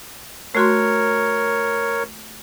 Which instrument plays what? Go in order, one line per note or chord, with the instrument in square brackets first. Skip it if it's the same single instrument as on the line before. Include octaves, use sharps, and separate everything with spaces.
[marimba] A3 F#4 C6 [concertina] A#4 C#5